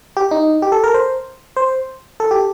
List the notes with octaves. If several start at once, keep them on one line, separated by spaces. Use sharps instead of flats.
G4
D#4
G4
A4
A#4
C5
C5
A4
G4